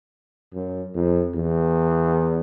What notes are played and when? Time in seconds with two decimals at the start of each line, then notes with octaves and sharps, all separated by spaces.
0.54 F#2
0.94 F2
1.35 E2